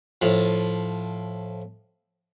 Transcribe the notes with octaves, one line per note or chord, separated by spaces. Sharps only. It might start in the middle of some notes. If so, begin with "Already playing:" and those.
A2 F3